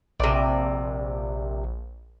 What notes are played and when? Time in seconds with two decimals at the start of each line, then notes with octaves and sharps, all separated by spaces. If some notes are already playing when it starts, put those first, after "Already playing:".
0.20 A#1 C3 D5